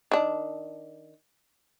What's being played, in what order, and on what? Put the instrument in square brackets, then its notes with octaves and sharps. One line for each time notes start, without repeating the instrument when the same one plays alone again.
[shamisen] D#3 D4